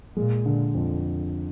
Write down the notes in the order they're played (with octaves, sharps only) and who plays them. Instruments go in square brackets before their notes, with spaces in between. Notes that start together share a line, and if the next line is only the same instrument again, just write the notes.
[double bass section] A#2 [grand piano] G#3
[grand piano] D3
F2